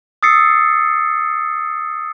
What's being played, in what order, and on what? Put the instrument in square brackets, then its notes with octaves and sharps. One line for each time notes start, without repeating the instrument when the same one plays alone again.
[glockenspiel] D#6 E6 A6 C7 C#7